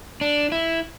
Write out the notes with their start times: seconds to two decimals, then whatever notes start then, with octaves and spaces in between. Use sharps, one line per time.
0.21 D4
0.52 E4